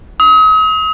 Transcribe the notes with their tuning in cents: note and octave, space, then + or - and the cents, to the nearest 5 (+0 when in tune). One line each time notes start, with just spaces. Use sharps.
D#6 +40